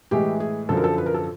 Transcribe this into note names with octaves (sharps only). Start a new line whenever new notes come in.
A2 E3 G#3 G4
G#4
F#2 D3 F3 A4
A#4
A4
B4
A#4
A4